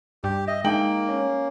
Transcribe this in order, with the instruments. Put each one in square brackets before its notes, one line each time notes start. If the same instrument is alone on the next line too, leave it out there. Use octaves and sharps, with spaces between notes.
[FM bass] G2 [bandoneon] G4
[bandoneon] D#5 [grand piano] E5
[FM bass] G#3 [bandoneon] A#3 [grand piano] D#4 G5 F#7
[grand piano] C#4